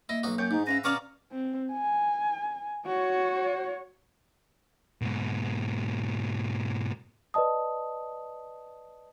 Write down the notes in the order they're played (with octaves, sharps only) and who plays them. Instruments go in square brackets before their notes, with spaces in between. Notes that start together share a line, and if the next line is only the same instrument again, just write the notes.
[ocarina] A#3 [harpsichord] E4 [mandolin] D#5
[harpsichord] B1 D#4 F#4
[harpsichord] F#2 [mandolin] G4 C#5 G6
[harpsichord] G#2 [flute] D#4
[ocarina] C#4 [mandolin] B4 E5 F5 [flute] A#6
[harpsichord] B2 D5 F5 [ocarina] C#4 [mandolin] G#4 A#5 C#6 [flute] F6
[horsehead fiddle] C4
G#5
F#4 C#5
[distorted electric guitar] G#2 B2
[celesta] B4 D5 D#5 A5 D#6